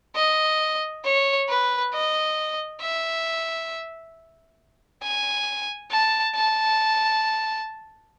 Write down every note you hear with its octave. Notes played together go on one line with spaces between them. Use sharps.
D#5
C#5
B4
D#5
E5
G#5
A5
A5